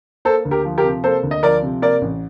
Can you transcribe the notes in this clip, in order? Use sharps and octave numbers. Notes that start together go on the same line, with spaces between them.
A#3 A4 C5
D2
G4 A#4
F3
G4 A#4
C3
A#3 A4 C5
D2
D#5
F3 A#4 D5
C3
A#3 A#4 D5
A1